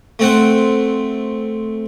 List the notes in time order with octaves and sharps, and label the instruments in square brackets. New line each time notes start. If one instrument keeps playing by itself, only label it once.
[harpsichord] A3 C4 F#5